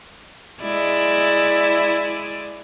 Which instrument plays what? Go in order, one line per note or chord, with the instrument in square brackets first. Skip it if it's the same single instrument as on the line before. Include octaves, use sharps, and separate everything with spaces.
[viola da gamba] G#3 E4 D5